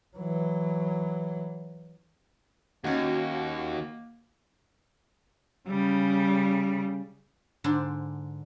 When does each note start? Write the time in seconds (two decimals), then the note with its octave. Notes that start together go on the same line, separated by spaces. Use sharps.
0.17 E3 F#3
2.84 D#2 A#3 C#4 D#4 F#4
5.68 C#3 G3
7.64 G#2 D3 D4 G5 C6